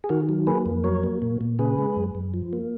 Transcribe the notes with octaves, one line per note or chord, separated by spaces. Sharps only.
G#4
D#3 F#4 A#4
F#3
A#3 G#4 B4
F2
F#3 A#4 C#5
A#3
A#2
A#2
C#3 G#4 B4
G#3
F#2
F#2
F3
A#3